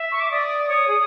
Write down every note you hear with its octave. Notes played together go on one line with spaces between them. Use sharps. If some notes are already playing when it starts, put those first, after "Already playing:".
Already playing: E5
C#6
D6
D5 D#6
C#5 D#6
G#4